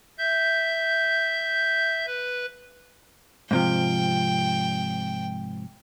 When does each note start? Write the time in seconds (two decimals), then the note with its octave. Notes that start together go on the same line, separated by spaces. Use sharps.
0.19 E5 G6
2.07 B4
3.51 G#2 C3 F3 G5